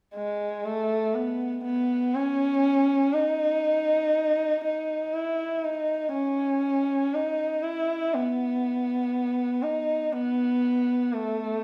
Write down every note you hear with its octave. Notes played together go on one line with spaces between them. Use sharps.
G#3
A3
B3
B3
C#4
D#4
D#4
E4
D#4
C#4
D#4
E4
B3
D#4
B3
A3